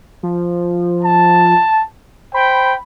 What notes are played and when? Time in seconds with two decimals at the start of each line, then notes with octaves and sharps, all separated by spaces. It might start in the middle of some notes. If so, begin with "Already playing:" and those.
0.23 F3
1.04 A5
2.34 C5 G5 B5